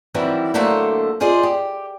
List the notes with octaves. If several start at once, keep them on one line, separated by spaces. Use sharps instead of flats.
D#3 E3 F#3 G3 C4 E4
D3 F#3 A3 A#3 A4 C5
F4 G#4 C5 D5 D#5
G4